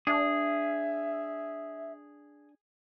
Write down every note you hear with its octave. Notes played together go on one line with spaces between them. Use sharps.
D4 G#4 E5